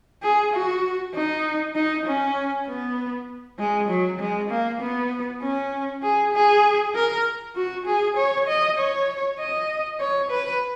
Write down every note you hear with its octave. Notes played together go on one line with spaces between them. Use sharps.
G#4
F#4
D#4
D#4
C#4
B3
G#3
F#3
G#3
A#3
B3
C#4
G#4
G#4
A#4
F#4
G#4
C#5
D#5
C#5
D#5
C#5
B4